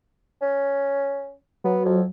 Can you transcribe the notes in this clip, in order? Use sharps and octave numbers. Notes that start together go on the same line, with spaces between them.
C#4
F#3 B3
F2